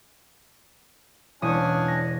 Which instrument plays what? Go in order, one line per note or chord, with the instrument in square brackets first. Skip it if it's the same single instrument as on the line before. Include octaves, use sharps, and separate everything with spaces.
[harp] E1 D#6 C#7 [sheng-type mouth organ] C#4 D4 G#5
[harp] A#6